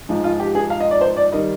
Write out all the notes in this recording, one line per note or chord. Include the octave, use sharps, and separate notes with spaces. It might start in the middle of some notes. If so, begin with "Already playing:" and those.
G#2 F3 G#3
F4
G4
G#4
F5
D#5
D5
C5
D5
D#3 G3 D#5